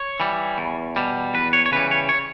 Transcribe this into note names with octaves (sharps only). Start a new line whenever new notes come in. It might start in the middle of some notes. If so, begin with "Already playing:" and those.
Already playing: C#5
E3 G3
E2
B2 G3
E2 B4
C#5
C#5
C#3 E3 G3 B4
C#5
C#5